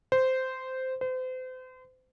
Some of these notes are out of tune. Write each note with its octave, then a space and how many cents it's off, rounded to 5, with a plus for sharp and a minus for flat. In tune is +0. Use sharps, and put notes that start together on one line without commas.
C5 -10
C5 -35